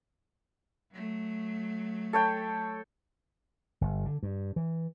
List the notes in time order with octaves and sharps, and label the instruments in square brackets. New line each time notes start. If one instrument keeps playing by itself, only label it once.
[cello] F#3 A3
[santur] A4 C#5 G5
[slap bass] G1
D3
G2
E3